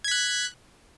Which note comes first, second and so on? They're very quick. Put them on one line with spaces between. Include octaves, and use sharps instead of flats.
G#6 B6 F#6